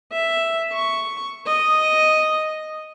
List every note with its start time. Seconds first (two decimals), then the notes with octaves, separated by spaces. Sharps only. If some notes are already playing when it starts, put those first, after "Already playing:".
0.13 E5
0.74 C#6
1.47 D#5